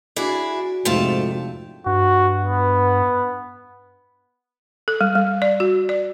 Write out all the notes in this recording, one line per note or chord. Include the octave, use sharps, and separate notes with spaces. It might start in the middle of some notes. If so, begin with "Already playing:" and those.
D4 E4 F#4 G#4 D5
F2 G#2 C3 A3 F4 G5 A5
G2 F#4
B3
A4
G3
G3
D5
F#4
D5